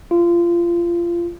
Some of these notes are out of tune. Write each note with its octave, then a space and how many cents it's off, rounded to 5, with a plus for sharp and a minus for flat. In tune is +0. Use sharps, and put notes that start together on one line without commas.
F4 -25